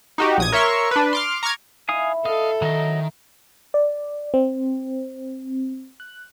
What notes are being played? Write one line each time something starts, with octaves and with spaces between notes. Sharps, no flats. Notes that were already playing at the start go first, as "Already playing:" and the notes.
D#4 F#4 G4
A#1 D#6 G#6
A#4 C#5 E5 C6 C#6
D4 B4
C6 D6 F6
A#5 C#6 D6 F6 G#6
E4 F5 G#5 D#6
A4 D#5 F5
D#3 F#3 D#5
D5
C4
F#6